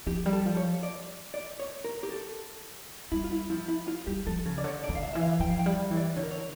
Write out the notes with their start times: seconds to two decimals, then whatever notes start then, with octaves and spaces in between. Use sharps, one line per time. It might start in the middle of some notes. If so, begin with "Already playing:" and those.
0.07 F3 G4
0.26 G3
0.33 A4
0.45 F3
0.57 C#5
0.83 D5
1.34 D5
1.60 C#5
1.84 A#4
2.03 G4
2.10 A4
3.12 G3 E4
3.24 F4
3.31 E4
3.50 F3 E4
3.68 E4
3.88 F4
4.07 G3 G4
4.27 F3 A4
4.45 C#3
4.58 D5
4.64 D3 C#5
4.84 D5
4.89 D3
4.95 F5
5.03 E5
5.13 E3 E5
5.21 F5
5.40 F3 G5
5.50 F5
5.59 G5
5.66 G3
5.91 E3
5.97 D5
6.16 D3 C#5
6.23 A#4
6.31 C#5